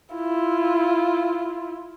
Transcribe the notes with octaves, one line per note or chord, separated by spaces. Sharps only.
E4 F4